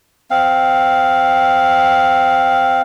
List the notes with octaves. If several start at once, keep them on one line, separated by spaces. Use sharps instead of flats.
C4 F5